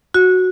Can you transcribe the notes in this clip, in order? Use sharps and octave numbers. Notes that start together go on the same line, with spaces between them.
F#4